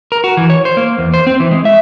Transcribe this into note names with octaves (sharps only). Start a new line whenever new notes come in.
A#4
F#4
E3
C#5
C5
A#3
E2
C5
C4
E3
G#3
E5